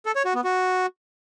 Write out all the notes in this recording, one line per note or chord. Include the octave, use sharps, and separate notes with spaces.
A4
C#5
F#4
B3
F#4